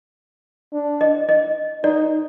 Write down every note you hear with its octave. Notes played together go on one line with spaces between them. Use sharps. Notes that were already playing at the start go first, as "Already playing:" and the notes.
D4
D#5
D#5
D#4 D5